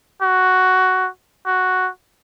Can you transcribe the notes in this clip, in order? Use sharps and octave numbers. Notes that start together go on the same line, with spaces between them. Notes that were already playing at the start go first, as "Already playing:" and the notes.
F#4
F#4